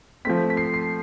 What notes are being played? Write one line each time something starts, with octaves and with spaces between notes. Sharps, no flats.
F3 A3 C4 B6
B6
C7
C7